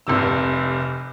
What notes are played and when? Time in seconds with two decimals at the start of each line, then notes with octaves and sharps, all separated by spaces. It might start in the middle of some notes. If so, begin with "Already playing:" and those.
0.07 F1 C2 C3 E6